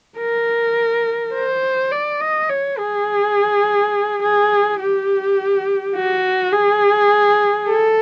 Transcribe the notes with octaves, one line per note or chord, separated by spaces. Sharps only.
A#4
C5
D5
D#5
C#5
G#4
G#4
G4
F#4
G#4
A4